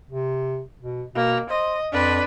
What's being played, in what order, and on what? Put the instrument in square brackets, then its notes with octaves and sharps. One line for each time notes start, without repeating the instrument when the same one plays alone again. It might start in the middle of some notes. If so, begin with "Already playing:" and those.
[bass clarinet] C3
B2
[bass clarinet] B2 [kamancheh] A#3
[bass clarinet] C5 [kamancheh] D#5
[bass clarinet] F2 [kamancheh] D4 B4